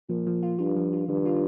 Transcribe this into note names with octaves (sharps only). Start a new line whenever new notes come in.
A#2 F3
F3
F4
G2 F4
F3
F4
G2 D#3
F4